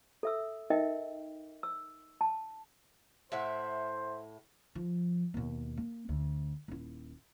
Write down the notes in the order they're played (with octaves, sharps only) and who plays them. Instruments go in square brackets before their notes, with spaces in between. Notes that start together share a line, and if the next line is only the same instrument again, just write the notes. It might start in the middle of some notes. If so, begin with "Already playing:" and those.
[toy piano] A4 E5 E6
D#4 A#4 D#5 E5 G5
E6
A5
[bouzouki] A2 E5 F#5 [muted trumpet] C5
[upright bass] F3
D#2 B2
A#3
D2
D#1 E4